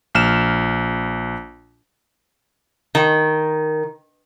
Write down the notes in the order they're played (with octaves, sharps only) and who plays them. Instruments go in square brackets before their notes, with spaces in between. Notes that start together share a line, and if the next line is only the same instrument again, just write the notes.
[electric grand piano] A#1 F6 E7
[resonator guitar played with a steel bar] D#3